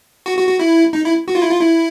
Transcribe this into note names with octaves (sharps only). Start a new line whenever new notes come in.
F#4
F#4
F#4
E4
D#4
E4
F#4
F4
E4
F4
E4